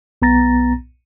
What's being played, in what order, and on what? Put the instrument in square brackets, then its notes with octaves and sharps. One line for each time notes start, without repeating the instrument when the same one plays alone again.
[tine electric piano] B1 B3 A#5 A6 A#6